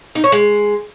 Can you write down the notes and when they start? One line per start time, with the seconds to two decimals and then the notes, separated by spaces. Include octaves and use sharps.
0.15 D#4
0.24 C#5
0.32 G#3